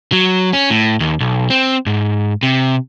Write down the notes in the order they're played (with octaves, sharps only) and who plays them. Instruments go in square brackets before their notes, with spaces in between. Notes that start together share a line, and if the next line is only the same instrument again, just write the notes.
[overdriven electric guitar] F#3
C#4
A2
D#2
B1
C4
G#2
C3